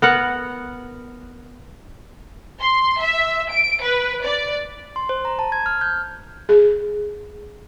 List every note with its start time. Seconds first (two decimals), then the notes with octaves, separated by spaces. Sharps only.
0.02 B3 A#4 F#5
2.60 C6
2.99 E5
3.51 D7
3.81 B4
4.23 D5
4.96 C6
5.09 C5
5.25 A#5
5.39 A5
5.52 G#6
5.66 F6
5.81 G6
6.49 G#4